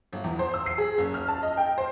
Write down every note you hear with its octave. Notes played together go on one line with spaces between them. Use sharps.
G1
E2
C5
E6
C7
G#4
F#1
F6
A5
D#5
G5
C5